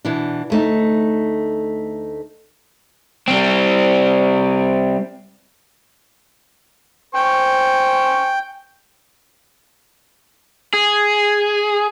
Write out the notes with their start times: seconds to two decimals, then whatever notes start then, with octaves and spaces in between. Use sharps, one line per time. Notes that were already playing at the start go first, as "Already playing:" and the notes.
0.05 B2 E3 D4
0.50 D2 A3 D#4
3.28 G3 C4
7.15 C5 G5 G#5 C#6
10.73 G#4